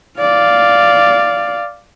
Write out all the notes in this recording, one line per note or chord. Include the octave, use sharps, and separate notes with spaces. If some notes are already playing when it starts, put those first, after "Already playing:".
D5 F5